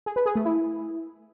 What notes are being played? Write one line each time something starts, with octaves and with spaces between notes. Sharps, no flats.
G#4
B4
G#4
A3
E4